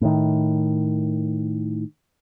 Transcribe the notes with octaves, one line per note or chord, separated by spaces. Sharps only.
A2 D#3